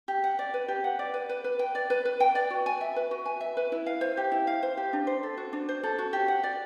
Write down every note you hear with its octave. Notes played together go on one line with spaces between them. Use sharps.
G4
F#5
D5
B4
G4
F#5
D5
B4
B4
B4
G5
D5
B4
B4
G5
D5
F#4
G#5
E5
B4
F#4
G#5
E5
B4
E4
F5
C5
G4
E4
F5
C5
G4
D4
C5
A4
F#4
D4
C5
A4
F#4
G4
F#5
D5